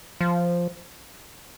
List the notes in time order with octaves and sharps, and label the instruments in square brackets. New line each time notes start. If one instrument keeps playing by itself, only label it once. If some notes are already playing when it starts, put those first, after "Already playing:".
[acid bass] F3